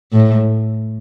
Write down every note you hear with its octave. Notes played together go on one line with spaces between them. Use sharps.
A2